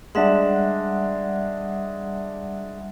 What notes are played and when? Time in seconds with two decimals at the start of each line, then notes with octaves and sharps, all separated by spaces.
0.15 G3 G#3 D4 E5 F#5